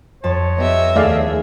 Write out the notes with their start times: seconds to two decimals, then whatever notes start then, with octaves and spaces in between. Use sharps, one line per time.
0.24 F2 C#5 A5
0.58 B3 G4 D#5 E5
0.96 D#2 A3 G#4 D5 F5